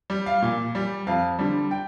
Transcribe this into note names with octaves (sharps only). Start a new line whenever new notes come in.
G3
F5
A#2
G3
F2 F5
D3 G3
G5